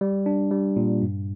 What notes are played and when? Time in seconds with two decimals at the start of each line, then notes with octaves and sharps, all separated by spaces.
0.01 G3
0.26 D4
0.51 G3
0.77 A#2
1.02 G2